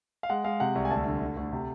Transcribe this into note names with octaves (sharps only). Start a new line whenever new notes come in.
F5
G#3 F#5
G#3 F5
C3 F#5
C2
G#5
D2 A5
D3
D3
D2
C3